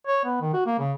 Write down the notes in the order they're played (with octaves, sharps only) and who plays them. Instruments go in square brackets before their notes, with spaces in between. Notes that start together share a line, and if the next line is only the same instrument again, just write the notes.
[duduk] C#5
B3
D#3
F#4
A#3
C#3